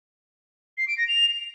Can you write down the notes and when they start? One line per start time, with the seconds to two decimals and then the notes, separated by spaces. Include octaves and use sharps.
0.78 C7
0.88 D7
0.98 A#6
1.08 F7